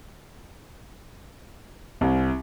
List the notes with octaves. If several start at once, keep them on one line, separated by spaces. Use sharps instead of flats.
C2